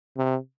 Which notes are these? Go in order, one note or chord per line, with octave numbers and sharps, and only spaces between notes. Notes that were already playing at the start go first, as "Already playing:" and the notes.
C3